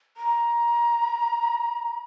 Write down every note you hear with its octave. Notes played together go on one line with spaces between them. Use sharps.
A#5